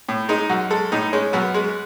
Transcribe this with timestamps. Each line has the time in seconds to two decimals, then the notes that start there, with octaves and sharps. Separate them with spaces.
0.09 A2
0.29 G#3 D#4
0.50 F#2 F#4
0.70 G#3 A4
0.92 A2 D#4
1.13 G#3 C#4
1.33 F#2 B3
1.54 G#3